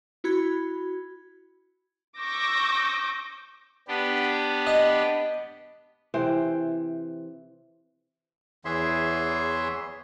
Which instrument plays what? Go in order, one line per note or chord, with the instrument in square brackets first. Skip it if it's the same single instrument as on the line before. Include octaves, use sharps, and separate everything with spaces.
[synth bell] E4 F#4 B5 G#6
[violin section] C#6 D6 E6 G6 A#6
[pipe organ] B3 D4 G4
[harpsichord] D#5
[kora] C3 E3 C5 G5
[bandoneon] E2 E3 G#4 C#5 E5 C6